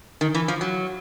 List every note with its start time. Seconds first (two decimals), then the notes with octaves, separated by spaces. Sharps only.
0.21 D#3
0.35 E3
0.48 F3
0.61 F#3